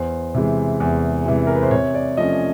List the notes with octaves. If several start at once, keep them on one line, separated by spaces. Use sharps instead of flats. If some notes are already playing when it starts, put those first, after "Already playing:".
Already playing: E2 C5
C3 E3 G#3
E2
C3 E3 G#3
A#4
B4
C5
C3 C#5
D5
F3 A3 C#4 D#5